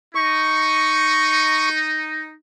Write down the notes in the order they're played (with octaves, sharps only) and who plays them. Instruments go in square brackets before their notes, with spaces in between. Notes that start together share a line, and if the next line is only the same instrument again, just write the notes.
[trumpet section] D#4 [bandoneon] C#6